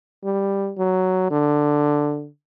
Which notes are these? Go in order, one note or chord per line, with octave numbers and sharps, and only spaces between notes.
G3
F#3
D3